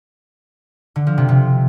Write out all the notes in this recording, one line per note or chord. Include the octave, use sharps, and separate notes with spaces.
D3
F3
C3
C3